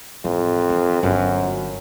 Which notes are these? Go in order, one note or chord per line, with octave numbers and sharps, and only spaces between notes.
A1 F2
E3
G1 F#2 D3